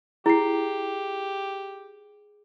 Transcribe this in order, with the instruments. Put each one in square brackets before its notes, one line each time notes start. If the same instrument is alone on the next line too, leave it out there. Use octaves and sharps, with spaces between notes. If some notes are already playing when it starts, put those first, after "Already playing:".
[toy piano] E4 [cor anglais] G4 [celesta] G#4 C7